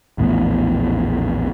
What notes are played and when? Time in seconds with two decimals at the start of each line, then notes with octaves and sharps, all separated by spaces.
0.18 A#1 E2 A2 B3